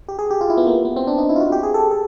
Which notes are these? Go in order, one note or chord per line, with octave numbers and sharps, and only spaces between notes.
G4
G#4
G4
F4
E4
B3
A#3
B3
C4
D4
D#4
E4
F4
F#4
G4
G#4
A4
A4